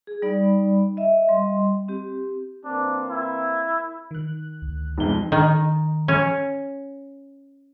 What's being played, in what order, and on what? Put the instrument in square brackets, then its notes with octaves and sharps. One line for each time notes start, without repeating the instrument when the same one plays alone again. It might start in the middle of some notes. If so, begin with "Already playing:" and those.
[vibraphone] G#4
G3 D#4 D5 B5
D#5 E5
G3 D#5 C6
C4 G4
[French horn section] E3 A#3 C4 [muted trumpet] D4
[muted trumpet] E4
[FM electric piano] D#3 F#6
[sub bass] D2
[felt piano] E1 F2 [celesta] D#4 G7
[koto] D#3
C#4